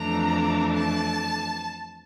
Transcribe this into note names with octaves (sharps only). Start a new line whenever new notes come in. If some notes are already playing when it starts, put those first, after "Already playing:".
Already playing: F2 E3 A3 D4 A#5
A5